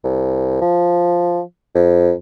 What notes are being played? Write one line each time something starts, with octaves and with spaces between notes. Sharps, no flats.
C2
F3
F2